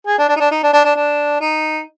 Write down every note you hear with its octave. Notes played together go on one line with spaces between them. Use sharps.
G#4
D4
D4
D#4
D4
D#4
D4
D4
D4
D4
D#4